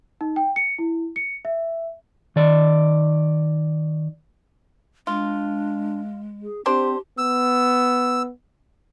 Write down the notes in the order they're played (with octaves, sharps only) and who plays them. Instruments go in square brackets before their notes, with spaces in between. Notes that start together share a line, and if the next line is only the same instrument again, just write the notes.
[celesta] D#4
G5
C#7
E4
C#7
E5
[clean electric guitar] D#3 D5
[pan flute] G#3 [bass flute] D4 [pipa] F4
[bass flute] G#4
[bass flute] C4 [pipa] D4 C5 [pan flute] G4
[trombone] B3 [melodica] E6